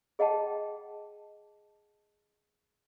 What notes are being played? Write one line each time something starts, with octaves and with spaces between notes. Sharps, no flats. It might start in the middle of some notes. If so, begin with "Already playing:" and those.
G#4 D#5 F#5 G5 A5